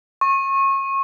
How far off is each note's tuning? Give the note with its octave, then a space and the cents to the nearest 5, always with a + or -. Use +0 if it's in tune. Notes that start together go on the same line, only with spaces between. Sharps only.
C#6 -30